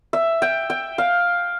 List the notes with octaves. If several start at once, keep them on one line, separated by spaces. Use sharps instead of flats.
E5
G5
G5
F5